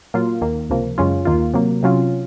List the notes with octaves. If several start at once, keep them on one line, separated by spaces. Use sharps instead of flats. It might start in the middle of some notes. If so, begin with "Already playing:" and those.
A#2 F#3 A#3 F4
D#2 D#3 A#3
C#2 C3 F3 A#3
F#2 C#3 G#3 C#4 F4
D#2 D#3 A#3 F4
C3 F#3 A#3
C3 F#3 C#4 F4